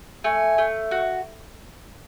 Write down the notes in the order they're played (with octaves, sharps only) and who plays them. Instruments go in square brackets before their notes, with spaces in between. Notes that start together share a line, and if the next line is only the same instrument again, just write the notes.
[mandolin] A3 [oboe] G#5
[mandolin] A3
F#4